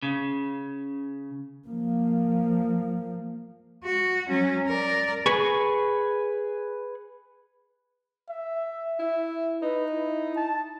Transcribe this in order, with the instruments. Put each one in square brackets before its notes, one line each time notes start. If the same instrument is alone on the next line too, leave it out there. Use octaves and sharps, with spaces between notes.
[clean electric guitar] C#3
[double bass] F3 A#3
[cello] F#4
F#3 C#4
A#4 D5
[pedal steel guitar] G#4 B4 C#6
[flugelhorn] E5
[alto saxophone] E4
[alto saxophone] D#4 [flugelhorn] B4
[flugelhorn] E4
A5